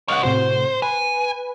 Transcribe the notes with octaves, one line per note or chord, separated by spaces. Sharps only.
C#5 D#5 F5 F#5
A2 C3 F#4 C5
B4 G#5